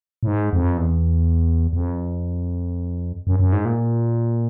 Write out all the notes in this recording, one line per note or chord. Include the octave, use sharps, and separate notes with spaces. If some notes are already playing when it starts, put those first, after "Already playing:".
A2
G#2
F2
E2
E2
F2
F#2
F#2
G#2
A#2